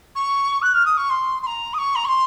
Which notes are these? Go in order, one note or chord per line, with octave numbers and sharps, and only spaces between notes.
C#6
F#6
F6
D#6
C#6
C6
C6
A#5
D#6
C#6
A#5
C#6
C6